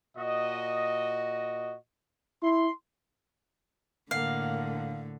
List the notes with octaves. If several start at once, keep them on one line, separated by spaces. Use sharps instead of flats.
A#2 F#4 D#5
E4 C6
A2 D3 A#3 F5 F#5